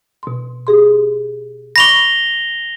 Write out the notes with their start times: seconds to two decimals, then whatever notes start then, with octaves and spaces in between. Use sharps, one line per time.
0.23 B2 C6
0.67 G4 G#4 C6
1.76 B5 C#6 D6 A#6 F7 G7